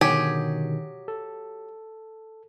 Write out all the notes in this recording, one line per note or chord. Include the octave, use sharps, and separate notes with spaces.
B2 D3 D#3 F#3 G4 G#4
A4